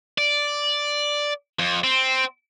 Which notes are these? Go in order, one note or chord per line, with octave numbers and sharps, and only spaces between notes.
D5
F2
C4